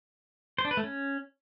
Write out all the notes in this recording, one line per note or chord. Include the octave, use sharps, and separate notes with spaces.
C5
D4
B4
A3
C#4